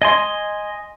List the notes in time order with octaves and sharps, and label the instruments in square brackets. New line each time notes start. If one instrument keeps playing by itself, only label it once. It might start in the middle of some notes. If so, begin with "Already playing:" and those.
[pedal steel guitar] D#5 G#5 C6